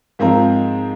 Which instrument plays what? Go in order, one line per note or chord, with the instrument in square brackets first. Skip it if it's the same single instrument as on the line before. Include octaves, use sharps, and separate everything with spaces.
[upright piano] G#2 F3 C4 F4 A#4